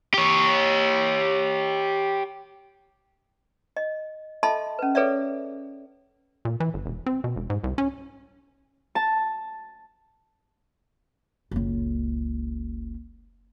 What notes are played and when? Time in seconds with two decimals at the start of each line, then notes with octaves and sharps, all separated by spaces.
0.14 G4 C#5
3.77 D#5
4.43 A4 D#5 E5 A5 B5 C6
4.79 C#4 B4
4.95 G#4 A4 B4 C#5 D5 E5
6.45 A#2
6.60 E3
6.74 G1
6.86 E1
7.06 C4
7.24 B2
7.36 E1
7.50 G#2
7.64 C2
7.78 C#4
8.95 A5
11.51 F#1 C#2